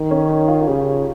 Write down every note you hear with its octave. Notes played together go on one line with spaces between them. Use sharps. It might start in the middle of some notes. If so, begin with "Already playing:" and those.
Already playing: D#3
C#4
D#4
F4
F4
C#3 G4